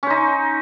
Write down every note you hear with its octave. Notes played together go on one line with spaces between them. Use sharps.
C#4 D#4 C5